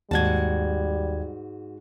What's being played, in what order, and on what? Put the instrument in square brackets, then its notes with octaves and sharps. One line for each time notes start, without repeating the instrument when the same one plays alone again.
[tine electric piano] D#2 G#6 [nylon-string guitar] G#2 F#4 A5 [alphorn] G3